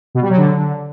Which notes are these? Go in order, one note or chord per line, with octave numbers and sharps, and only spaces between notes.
B2
G3
F#3
D3